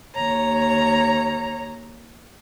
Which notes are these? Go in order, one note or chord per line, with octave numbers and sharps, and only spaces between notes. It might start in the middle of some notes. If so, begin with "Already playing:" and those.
D#2 C#5 A#5